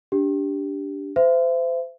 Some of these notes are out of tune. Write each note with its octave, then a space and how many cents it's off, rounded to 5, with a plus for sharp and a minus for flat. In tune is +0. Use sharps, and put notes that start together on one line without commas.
D4 -15 G4 +0
C5 -30 E5 +35